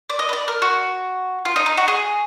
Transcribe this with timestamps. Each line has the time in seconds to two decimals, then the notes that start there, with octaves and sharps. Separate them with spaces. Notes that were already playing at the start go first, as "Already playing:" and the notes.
0.10 D5
0.19 D#5
0.29 B4
0.33 D5
0.48 A#4
0.62 F#4
1.45 F4
1.56 D#4
1.66 D#4
1.77 F#4
1.88 G#4